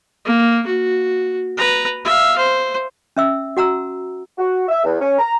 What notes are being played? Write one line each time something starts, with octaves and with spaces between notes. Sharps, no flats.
A#3
F#4
B4 A#5
E5 F5
C5
C#4 E5 E6
F#4 F#5 A#5 E6
F#4
E5
E2
C#4
A#5